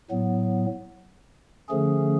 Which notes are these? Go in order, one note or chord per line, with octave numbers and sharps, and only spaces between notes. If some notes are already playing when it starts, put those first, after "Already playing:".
A2 F#3 B3
D3 F3 A3 C#4 G#4